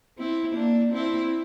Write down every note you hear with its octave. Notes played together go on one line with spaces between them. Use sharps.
C4 E4
A#3 D4
C4 E4